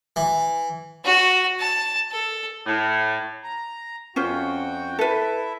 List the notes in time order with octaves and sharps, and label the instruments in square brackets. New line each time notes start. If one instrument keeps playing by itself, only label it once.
[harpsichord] E3
[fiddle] F#4
A5
A4
[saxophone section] A2
[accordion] A#5
[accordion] F2 F#4 G5 [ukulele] C#4 F4 C5
[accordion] E4 E5 [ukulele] A4 B4